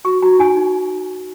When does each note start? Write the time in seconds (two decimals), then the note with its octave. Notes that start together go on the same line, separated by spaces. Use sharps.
0.04 F#4 C#6
0.22 F#4 A#5
0.39 D#4 G#5
0.57 D#4